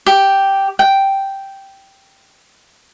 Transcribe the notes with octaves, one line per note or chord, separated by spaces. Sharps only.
G4
G5